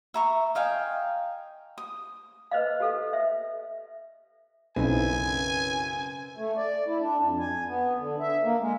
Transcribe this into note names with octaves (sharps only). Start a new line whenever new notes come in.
E5 A#5 C#6
D#5 F5 G5 G#5
D#6
B4 C5 D#5 F5
G4 A4 F5
E5
B1 F#2 C#3 C4 E4 B4 G#5
A3
D5
E4
D4
F2
G#5
B3
D3
E5
A#3
G#3